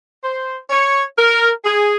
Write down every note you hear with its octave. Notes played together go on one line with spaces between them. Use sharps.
C5
C#5
A#4
G#4